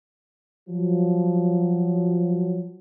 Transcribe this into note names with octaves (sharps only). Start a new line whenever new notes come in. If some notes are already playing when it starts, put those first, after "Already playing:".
F3 F#3